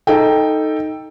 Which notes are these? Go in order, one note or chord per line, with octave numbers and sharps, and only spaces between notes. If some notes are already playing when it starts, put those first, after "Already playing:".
D#4 A4 G5